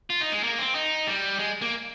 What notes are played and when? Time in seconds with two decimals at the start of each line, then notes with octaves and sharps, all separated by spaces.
0.10 F4
0.21 D#4
0.32 G#3
0.43 A#3
0.59 C4
0.75 D#4
1.07 G3
1.39 G#3
1.62 A#3